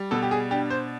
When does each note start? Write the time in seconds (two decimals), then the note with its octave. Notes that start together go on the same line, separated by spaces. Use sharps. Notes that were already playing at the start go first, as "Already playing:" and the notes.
Already playing: G3
0.11 B2 A4
0.23 G4
0.31 G#4
0.51 D4 G4
0.70 C5